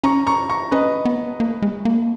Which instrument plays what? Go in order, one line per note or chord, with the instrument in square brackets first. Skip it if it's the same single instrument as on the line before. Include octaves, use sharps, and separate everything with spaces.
[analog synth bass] C#4 [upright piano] A#5 C#6
[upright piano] A#5 C#6
A#5 C#6
[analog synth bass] C#4 [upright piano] B4 D#5
[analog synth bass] B3
A#3
G#3
A#3